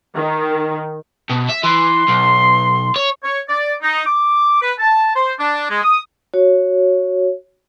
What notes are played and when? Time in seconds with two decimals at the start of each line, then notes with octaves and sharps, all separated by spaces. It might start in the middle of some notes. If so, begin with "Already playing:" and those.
0.16 D#3
1.30 B2
1.49 E5
1.64 E3 C6
2.08 B1
2.96 C#5
3.24 C#5
3.49 D5
3.82 D#4
4.07 D6
4.62 B4
4.79 A5
5.16 C5
5.39 D4
5.70 G#3
5.83 D#6
6.34 F#4 C#5